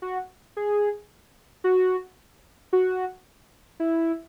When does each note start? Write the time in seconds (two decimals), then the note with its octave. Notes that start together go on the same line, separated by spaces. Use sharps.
0.02 F#4
0.57 G#4
1.64 F#4
2.73 F#4
3.80 E4